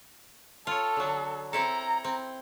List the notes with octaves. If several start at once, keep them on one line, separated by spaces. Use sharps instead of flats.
F4 A4 C#5
D3 F#3
C4 E4 A4 A#5
C4